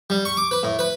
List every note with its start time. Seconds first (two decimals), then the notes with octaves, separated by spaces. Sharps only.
0.10 G3
0.25 C#6
0.37 D6
0.51 B4
0.63 A2
0.79 B4